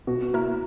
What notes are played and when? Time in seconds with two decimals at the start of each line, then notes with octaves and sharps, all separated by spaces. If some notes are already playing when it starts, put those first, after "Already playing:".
0.07 B2 F#4
0.34 A#3 E4 A#4